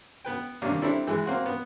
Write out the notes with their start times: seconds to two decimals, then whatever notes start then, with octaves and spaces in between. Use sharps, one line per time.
0.25 B3 B4 G5
0.62 D#2 C3 G3 A#3 D4
0.82 G3 C4 D4 E4 A4
1.07 E3 G#3
1.26 A#3 C4 F#4
1.46 B3